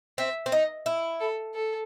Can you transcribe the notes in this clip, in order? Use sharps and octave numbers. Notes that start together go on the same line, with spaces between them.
C4 E5
C4
D#4 D#5
E4
A4
A4